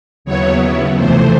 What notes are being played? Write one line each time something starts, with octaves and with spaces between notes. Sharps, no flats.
D#2 C#3 F#3 B3 E4 C#5
F2 C3 E3 A3 C5